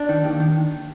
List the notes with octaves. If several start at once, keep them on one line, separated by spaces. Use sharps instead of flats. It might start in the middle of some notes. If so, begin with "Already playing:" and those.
Already playing: D4
D#3
D#2
D#3